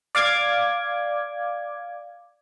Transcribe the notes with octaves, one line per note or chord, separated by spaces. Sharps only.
D5 F5 D6 G#6